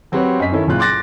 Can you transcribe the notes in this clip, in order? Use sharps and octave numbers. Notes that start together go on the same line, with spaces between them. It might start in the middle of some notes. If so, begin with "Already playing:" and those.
F#3 C4 F#4 G4 B4 C#5
F#2 D#5 B6
D#3 C#4 E4 A4
F#1 A#2 C#4 F4 F#6
C6 D6 F#6 A6 A#6